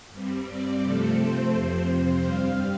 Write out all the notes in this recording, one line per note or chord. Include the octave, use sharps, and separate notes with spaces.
G2 G3 C4
D5
C3 F3 A3 C4 A4
C5
F2 C3 F3 C4 C5
G2 G3 C4 F5